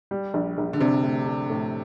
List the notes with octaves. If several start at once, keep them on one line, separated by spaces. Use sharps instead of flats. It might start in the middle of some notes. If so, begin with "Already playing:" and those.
G3
A#1
A#1
D3
C3 D4
A2
D4
A2